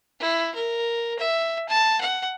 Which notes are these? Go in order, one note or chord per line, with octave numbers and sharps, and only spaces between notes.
E4
A#4
E5
A5
F#5